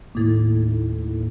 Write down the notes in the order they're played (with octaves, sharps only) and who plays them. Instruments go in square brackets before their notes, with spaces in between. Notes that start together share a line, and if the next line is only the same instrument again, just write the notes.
[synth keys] D#2 A2